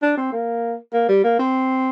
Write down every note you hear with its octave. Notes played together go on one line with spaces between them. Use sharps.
D4
C4
A#3
A#3
G3
A#3
C4